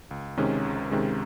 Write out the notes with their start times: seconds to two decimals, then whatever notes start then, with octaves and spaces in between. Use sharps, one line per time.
0.11 C#2
0.37 C3 D#3 G#3 C#4
0.65 C#2
0.91 C3 D#3 G#3 C#4